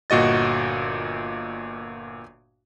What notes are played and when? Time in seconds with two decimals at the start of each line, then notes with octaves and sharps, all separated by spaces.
0.10 G1 A#2 F#4 D#5 A6